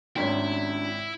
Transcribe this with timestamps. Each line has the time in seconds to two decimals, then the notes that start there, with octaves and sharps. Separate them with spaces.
0.16 G#1 C#4 D4 E4 F4 C#5 E5 G5